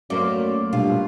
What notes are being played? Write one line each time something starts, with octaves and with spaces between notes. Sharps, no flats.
F#2 A3 A#3 C5 D5
G2 B2 F4